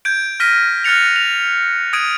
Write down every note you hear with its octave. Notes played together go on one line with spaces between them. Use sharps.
G6 G#6 D7
F6 A#6 B6 D#7
F6 F#6 A6 C#7 F7
F7
D#6 G#6 D7 D#7